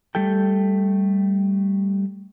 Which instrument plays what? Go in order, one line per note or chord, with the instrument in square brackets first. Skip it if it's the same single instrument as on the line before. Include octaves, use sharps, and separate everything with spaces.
[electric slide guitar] G3 A3 A4 G5